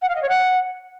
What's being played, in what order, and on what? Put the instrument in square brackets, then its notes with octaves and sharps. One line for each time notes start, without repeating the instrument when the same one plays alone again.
[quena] F#5
F5
D#5
C#5
F#5